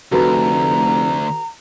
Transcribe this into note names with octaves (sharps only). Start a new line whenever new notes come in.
F1 D2 F#4 A4 B4 A#5